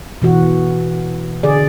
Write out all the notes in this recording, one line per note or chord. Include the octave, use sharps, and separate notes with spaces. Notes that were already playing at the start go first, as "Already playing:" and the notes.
B2 E3 F#4
D3 G#4 D5